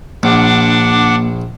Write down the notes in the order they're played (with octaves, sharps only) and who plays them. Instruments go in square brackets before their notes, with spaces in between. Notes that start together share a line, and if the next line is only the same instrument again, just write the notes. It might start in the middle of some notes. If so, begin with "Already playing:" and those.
[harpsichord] A#1 [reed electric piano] A#3 [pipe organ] D4 F#5 D6